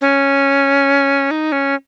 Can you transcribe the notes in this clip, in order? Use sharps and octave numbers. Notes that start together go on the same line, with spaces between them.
C#4
D#4
C#4